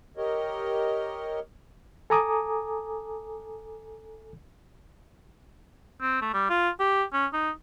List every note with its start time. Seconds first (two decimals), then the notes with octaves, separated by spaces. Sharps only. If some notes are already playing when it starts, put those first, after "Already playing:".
0.17 G4 A#4 C#5 D#5
2.10 A4 G#5 A#5 D6 D#6
6.02 C4
6.22 A3
6.34 G3
6.50 F4
6.80 G4
7.13 C#4
7.33 D#4